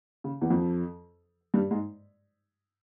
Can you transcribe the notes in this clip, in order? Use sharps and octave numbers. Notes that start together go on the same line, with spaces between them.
C#3
E2 E3
F2 F3
G2 G3
G#2 G#3